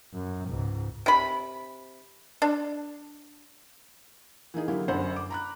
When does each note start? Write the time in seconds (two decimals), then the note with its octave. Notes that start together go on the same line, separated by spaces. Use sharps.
0.14 F#2
0.49 C#2 G#2
1.06 C3 B5
2.42 D4
4.54 E3 A#3 D#4 G#4
4.68 D3 F#3 A#3 E4 G4
4.88 G1 F#2 C5 F#5 B5
5.16 D6
5.30 A#5 B5 F#6